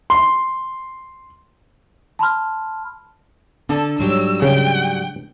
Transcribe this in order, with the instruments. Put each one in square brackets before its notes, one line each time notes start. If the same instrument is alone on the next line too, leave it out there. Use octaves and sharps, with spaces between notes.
[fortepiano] C6
[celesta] A5 B5 C6 F6
[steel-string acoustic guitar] D3 [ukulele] D4 [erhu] A4
[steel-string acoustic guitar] G#2 F#3 G3 [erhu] E6
[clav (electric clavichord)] C#3 [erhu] G5